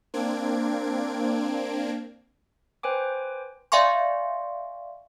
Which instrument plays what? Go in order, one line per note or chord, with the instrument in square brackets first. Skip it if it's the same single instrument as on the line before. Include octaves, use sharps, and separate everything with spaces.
[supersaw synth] A#3 C4 D4 G#6 D7
[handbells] B4 C5 G5 G#5 D6
D5 E5 F5 G#5 C6 C#6